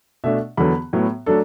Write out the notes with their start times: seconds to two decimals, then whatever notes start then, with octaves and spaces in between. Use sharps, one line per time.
0.24 B2 A3 D4 E5
0.57 E2 D3 F#3 B3 B5
0.93 A2 F#3 B3
1.26 F#3 A3 D4 A4